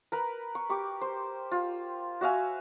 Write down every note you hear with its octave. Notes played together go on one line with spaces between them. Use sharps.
A#4 B4 B5
C#6
G4 C#6 D6
C5
F4
F#4 E5 F5 G#5